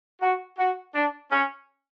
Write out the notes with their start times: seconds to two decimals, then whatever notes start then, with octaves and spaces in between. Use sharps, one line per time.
0.22 F#4
0.58 F#4
0.95 D4
1.31 C#4